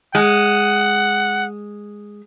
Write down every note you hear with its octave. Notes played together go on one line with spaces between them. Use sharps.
G#3 F#5